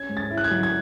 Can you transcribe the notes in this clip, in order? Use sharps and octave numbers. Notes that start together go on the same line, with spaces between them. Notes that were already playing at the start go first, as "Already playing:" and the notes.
Already playing: C#4 G#6
G#2
A6
E4
F#6
G#6
F#3
G#6